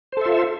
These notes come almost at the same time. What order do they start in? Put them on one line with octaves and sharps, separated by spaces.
C5 A4 E5 F4